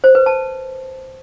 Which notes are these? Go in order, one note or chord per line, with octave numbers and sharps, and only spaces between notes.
C5
B4
A5